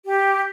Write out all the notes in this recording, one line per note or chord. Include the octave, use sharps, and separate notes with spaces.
G4